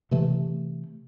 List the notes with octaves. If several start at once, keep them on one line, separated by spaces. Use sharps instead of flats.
C3 E3 A3